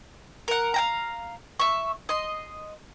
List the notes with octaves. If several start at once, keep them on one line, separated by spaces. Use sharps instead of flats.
A#4 F#5
F5 G5 A#5
E5 C#6
D#5 C6